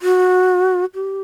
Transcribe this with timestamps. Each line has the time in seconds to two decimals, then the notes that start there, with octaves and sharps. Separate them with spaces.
0.02 F#4
0.95 G4